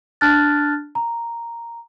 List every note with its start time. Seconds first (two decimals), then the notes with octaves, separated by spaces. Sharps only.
0.21 D4 A5 F6 F#6 A6
0.95 A#5